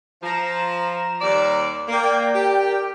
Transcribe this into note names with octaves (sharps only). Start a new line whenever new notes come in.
F3 A#5 E7
D#2 G3 D5
A#3 A#4 D5 G5
G4